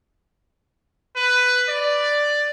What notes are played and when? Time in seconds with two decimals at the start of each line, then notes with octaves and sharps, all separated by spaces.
1.16 B4
1.69 D5